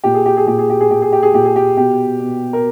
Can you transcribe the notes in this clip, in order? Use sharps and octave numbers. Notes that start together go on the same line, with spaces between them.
A#2 G4
G#4
G4
G#4
A#2 G4
G#4
G4
G#4
A#2 G4
G#4
G4
G#4
A#2 G4
G#4
G4
B2 G4
B2
A#4